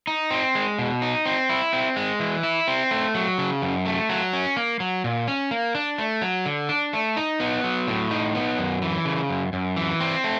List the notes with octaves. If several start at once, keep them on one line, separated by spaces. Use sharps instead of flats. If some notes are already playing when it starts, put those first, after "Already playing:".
D#4
C4
G#3
B2
D#4
C4
E4
C4
G#3
E3
E4
C4
A3
F#3
C#3
F#2
A3
F#3
C#4
A#3
F#3
A#2
C#4
A#3
D4
A3
F#3
D3
D4
A3
D#4
B3
F#3
A2
D#4
B3
F#2
E3
C#3
F#2
F#2
E3
C4
A3